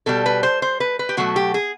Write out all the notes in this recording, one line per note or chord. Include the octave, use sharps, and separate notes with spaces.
B2 G3 A4
B4
C5
C5
B4
B4
G4
B2 F#3 A3 F#4
G4
G#4